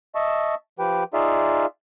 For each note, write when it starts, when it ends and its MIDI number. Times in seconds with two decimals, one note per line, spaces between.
0.15 0.55 75
0.15 0.55 76
0.15 0.55 81
0.15 0.55 85
0.79 1.04 53
0.79 1.04 67
0.79 1.04 71
0.79 1.04 79
1.14 1.66 63
1.14 1.66 65
1.14 1.66 68
1.14 1.66 74
1.14 1.66 76
1.14 1.66 77